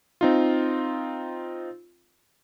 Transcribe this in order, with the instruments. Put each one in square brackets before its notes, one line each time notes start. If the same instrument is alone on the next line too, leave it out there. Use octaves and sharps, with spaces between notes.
[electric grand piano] C4 D#4 F4